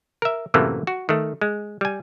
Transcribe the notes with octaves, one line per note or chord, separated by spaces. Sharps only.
A#4 E5
F#2 A2 C3 E3 A3 A#3
F#4
D#3 A3
G#3
G3 G#5